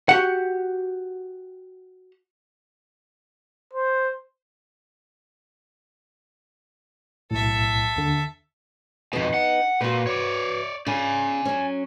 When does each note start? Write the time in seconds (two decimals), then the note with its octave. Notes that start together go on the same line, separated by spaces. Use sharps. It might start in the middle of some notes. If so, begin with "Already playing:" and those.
0.09 F#4 G4 F#5
3.73 C5
7.31 B1 A2 A4 E5
7.96 D#2 D3
9.13 F2 B2 B3 D#4
9.34 F#5
9.81 A#2 F#4 B4
10.07 C#5 D5
10.86 C#3 D5 G#5
11.45 F#3 C#4